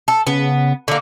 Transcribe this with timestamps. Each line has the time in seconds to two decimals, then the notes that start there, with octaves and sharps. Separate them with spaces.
0.08 A4
0.27 C#3 B3
0.88 D3 A#3